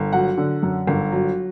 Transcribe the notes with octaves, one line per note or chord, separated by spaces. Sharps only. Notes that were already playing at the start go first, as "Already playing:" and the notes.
Already playing: G1
F#3 F#5
D3
F#2
G1
F#3